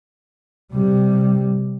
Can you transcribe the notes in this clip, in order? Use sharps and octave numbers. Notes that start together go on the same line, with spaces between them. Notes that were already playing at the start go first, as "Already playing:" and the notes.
C3 G3